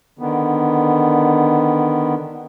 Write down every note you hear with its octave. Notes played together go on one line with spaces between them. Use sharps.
D3 D#3 B3